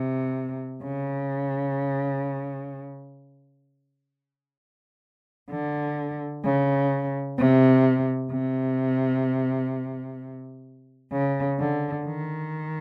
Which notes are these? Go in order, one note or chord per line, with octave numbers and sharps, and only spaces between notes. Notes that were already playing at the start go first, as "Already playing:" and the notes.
Already playing: C3
C#3
D3
C#3
C3
C3
C#3
D3
D#3